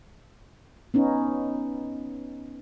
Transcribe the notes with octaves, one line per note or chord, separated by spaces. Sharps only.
B3 C#4 D#4